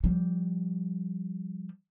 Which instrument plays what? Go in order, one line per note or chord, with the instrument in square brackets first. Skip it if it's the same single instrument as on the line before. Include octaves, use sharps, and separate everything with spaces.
[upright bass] F3 G3